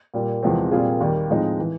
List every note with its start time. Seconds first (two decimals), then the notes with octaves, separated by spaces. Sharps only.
0.14 A#2 G3 A#3
0.43 E2 C3 F3 G#3 C4
0.71 A#2 G3 C4 F4 G#4
1.00 D#2 D#3 G3 A#3
1.29 A2 F3 G#3 C4 D#4
1.60 E3